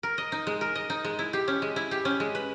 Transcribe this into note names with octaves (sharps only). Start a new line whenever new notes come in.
A#4
D#5
D#4
G#3
A#4
D#5
D#4
G#3
E4
G4
C#4
G#3
E4
G4
C#4
G#3
B4